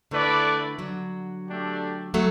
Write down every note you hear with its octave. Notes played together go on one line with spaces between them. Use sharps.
D3 A3 E4 B4 D5
D3 F#3
A3 D4 G4
F#3 A3